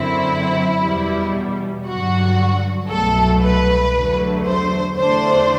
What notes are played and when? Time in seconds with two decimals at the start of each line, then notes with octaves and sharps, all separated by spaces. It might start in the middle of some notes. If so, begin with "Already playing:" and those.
Already playing: F#2 D3 F#3 C4 E4
0.83 E2 B2 G3
1.86 G2 D3 F#3 F#4
2.89 C2 B2 F#3 A3 A4
3.42 B4
3.93 E2 D3 F#3 A3
4.45 C5
4.96 E2 D3 A3 D4 C5